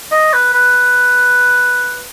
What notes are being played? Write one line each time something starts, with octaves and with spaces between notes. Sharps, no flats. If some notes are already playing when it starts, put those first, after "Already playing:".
D#5
B4
B4